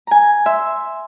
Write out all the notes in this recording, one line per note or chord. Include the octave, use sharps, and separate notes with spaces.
G#5 A#5
E5 C6